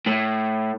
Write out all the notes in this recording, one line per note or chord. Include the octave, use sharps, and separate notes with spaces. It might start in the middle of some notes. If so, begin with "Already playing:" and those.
A2